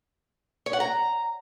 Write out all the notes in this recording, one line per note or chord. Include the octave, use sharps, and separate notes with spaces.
C#5
F#5
A#5